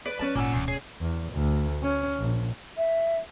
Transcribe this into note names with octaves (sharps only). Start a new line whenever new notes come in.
B4 D5
F#3 C#4 D5 A5
G#1 A#2 A#3 F#5 G#5 E6
D1 E2 B2
G#4 C#5
E2
D2
C#4
A#1
E5